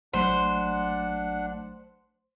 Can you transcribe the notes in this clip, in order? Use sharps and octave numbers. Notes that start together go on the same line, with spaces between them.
A1 F#3 A3 D4 C5 F#5